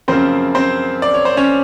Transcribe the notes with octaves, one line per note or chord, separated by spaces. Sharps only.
F#2 C#3 F3 A#3 C4 C5
C4 C5
D5
C#5
C5
C#4 C#5